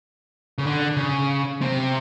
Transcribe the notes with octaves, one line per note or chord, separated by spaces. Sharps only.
C#3
D3
C#3
C3